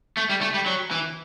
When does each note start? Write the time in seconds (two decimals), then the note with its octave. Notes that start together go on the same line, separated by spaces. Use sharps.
0.17 A3
0.29 G3
0.41 A3
0.54 G3
0.66 F#3
0.91 E3